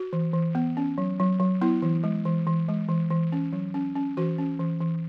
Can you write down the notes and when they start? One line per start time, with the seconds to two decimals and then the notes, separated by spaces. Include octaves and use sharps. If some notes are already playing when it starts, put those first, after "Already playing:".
Already playing: F#4
0.13 E3
0.33 E3
0.55 B3
0.77 C#4
0.98 F#3
1.20 F#3
1.40 F#3
1.61 B3 E4
1.82 E3
2.04 G#3
2.25 E3
2.47 E3
2.69 G#3
2.89 E3
3.10 E3
3.32 C#4
3.53 F#3
3.74 C#4
3.95 C#4
4.17 E3 F#4
4.38 C#4
4.60 E3
4.81 E3